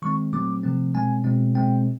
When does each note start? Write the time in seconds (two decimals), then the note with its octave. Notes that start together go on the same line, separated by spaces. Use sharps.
0.02 D#3 G#3 C4 C#6
0.32 A#2 F#3 A3 C4 D6
0.63 C3 F3 A3 C4
0.94 B2 G#3 C4 G#5
1.24 B2 G#3 C4
1.55 B2 G#3 C4 G5